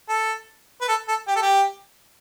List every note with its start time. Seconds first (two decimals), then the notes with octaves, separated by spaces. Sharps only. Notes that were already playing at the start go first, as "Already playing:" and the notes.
0.09 A4
0.82 B4
0.89 A4
1.09 A4
1.28 G4
1.36 A4
1.42 G4